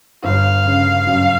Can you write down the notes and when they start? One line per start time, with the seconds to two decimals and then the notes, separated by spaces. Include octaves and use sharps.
0.24 G1 F5
0.65 C#3
1.07 F#2